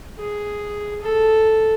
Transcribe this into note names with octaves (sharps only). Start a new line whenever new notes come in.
G#4
A4